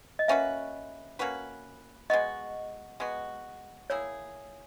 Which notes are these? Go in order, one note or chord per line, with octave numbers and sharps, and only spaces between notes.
D#5
A#3 C#4 F#4 B4 E5
A#3 C#4 F#4 B4
G#3 B3 F#4 D#5
G#3 B3 F#4
A#3 E4 G#4 C#5